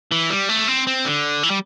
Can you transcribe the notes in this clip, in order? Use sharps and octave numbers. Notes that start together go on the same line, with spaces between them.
E3
G3
A3
C4
C4
D3
E3
G3